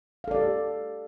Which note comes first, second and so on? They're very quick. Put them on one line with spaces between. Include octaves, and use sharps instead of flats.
F5 A4 D5 G4